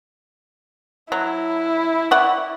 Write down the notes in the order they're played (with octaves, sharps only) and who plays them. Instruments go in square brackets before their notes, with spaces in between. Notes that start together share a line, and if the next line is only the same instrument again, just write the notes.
[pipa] F#3 [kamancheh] E4
[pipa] D5 F#5 C#6